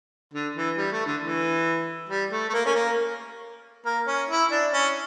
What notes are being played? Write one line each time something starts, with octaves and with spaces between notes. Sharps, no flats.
D3
E3
G3
A3
D3
E3
G3
A3
A3
A#3
C#4
A#3
A#3
C#4
E4
D4
C#4